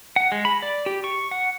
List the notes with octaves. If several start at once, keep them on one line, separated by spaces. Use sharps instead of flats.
F#5
G#3
B5
D5
G4
C#6
F#5